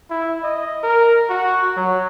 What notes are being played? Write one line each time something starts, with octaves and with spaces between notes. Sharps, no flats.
E4
D#5
A#4
F#4
F#3